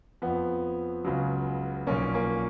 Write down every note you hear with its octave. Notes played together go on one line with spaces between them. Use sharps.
F2 F3 B3
C#2 C#3 F#3
B1 A#2 F3 A#3 C#4
A#3 C#4